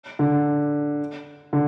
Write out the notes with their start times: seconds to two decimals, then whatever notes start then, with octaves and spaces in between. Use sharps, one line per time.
0.19 D3
1.53 D3